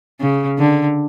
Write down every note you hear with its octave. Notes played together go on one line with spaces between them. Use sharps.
C#3
D3